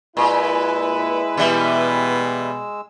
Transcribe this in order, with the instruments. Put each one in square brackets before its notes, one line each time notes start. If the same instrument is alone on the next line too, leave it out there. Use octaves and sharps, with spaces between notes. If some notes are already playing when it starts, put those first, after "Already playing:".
[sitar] A#2 [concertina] G#3 E6 [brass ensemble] E4 B4
[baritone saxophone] B2 [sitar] E3 G3